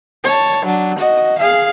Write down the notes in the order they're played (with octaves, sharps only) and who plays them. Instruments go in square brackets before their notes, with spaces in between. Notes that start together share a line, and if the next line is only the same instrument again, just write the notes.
[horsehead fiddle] C#5 A5
F#3 D4
F#4 D#5
G#4 F5